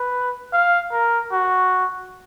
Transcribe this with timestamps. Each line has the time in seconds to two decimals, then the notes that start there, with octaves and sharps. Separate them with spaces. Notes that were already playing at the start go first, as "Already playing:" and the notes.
Already playing: B4
0.53 F5
0.92 A#4
1.32 F#4